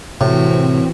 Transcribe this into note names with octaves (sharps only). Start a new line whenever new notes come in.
A2 C3 E3 C4 F#4